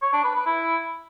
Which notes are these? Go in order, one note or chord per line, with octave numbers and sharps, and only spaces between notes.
C#5
D4
B4
B4
E4